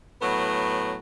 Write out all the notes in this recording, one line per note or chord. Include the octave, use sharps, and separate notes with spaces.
A2 F#3 B3